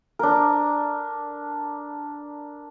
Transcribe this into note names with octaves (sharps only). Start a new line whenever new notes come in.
D4 A#4